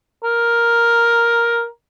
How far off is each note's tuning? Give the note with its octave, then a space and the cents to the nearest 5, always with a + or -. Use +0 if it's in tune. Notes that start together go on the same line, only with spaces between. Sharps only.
A#4 +5